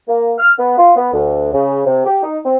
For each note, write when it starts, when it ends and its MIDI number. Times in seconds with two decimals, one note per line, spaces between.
0.08 0.33 58
0.39 0.51 89
0.58 0.74 59
0.78 0.93 65
0.96 1.13 59
1.13 1.52 38
1.53 1.82 49
1.86 2.02 48
2.05 2.20 67
2.23 2.38 63
2.45 2.56 60